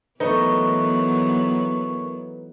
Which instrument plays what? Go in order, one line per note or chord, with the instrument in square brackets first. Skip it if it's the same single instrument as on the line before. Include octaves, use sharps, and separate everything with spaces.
[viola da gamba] E3 F#3 B3 [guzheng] A3 D#4 [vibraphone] A#4 C#6 [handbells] B4